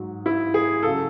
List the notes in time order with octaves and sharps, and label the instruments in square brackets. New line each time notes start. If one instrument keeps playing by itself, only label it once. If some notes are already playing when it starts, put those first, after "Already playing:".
Already playing: [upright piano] G#2 F#3
E4
G#4
C#2 C#3 F#3 A4